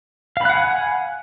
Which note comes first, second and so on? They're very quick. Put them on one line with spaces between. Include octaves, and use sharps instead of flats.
F5 B5 F#6 F#5 G#5